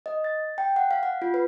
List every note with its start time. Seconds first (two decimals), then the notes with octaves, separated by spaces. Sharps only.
0.06 D#5
0.24 A6
0.58 G5
0.76 F#5
0.91 F5
1.03 F#5
1.22 F4
1.34 B4